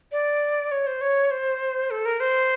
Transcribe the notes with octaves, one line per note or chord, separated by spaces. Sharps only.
D5
C#5
C5
C#5
C5
A4
A#4
C5